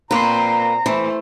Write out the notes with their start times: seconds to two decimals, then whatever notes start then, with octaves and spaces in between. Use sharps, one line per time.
0.11 A#2 A#3 C4 B4 C5 A#5
0.86 E3 A3 C5